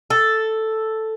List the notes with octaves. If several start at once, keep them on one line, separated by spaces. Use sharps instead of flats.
A4